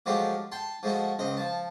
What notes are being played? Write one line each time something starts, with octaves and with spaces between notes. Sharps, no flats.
F3 F#3 G#3 A3 F4 G4
G5 A5 C6
F3 G#3 A3 F#4
C#2 C4 D#5
F3 A5